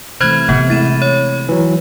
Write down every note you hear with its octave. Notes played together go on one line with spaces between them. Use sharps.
C3 E3 A3 C5 B5 F6 F#6 G#6
C3 B3 C4 F#5
G#3 A3 E4 A6 D#7 E7
C#5
E3 F#3